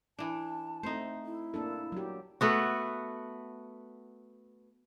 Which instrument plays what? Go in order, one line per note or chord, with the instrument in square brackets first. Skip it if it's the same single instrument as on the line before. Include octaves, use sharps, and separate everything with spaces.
[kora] E3 D4 [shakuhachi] A5
[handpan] A3 C4 [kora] D#4 C5
[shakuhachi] E4
[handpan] A#3 D4 A4
F#3 G4
[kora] A3 B3 F#4